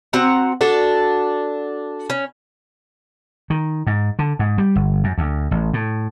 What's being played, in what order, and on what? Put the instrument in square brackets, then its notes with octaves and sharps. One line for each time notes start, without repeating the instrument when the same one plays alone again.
[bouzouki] C4 F#4 F#5 A#5
D4 F#4 A4
C#4
[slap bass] D#3
G#2
D3
G#2
G3
G1
F#2
D2
A1
A2